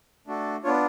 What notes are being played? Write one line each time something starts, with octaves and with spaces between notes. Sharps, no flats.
A3 D4 F#4 A4
B3 D4 F4 C#5